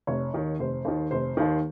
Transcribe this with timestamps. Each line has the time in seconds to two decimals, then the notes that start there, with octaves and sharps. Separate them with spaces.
0.07 F1 C#5
0.34 D#2 D#3
0.59 F1 C5
0.85 D#2 D#3
1.11 F1 C5
1.37 D#2 D#3